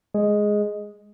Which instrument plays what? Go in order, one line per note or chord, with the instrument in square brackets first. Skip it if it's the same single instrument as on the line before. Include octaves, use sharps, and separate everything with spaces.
[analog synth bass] G#3